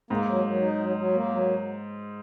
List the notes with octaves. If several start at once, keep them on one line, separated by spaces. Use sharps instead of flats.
G#2 A#3
F#3
F#3
D#4
F#3
F#3
A#3
F#3